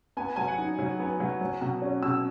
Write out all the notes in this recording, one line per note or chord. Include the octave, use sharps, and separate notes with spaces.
B3 G#5
F#3 G#5
F#5
D#4
F#3
B3
F#3
F#3
B2
C#4
B2 E6